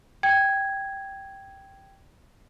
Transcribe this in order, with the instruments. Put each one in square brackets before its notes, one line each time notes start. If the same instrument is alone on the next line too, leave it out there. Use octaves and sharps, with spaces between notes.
[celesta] G5 G#6